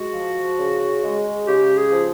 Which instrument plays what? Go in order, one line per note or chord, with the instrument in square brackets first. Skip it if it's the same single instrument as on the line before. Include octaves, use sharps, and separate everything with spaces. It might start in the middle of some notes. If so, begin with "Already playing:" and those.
Already playing: [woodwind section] G#3 [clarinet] F#4
[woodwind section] F3
C#3
G#3
[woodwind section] C#3 [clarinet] G4
[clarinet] G#4
[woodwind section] F3